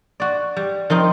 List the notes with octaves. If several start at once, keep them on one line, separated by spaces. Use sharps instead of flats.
F#4 D5
G3
D#3 F3 C4 D#4